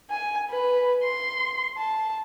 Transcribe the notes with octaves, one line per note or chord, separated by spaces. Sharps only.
G#5
B4
C6
A5